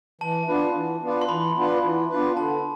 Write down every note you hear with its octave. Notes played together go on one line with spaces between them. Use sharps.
E3 A5
B3 D4 F4 B4
E3
B3 D4 F4 B4
C6
E3 B5
B3 D4 F4 B4
E3
B3 D4 F4 B4
D3 A5